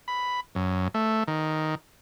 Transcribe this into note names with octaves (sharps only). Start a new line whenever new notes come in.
B5
F#2
A3
D#3